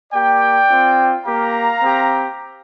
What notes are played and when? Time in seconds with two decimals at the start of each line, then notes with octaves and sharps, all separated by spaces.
0.13 A#3 G4 D5 G5
0.69 C4 F4
1.26 A#3 G4 F5 A#5
1.82 C4 G4